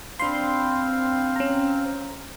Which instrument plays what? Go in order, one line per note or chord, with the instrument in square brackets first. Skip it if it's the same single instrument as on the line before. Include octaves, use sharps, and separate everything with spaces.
[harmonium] C4 C5 F5 [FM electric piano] D4 B5 C6
[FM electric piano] C#4 A#5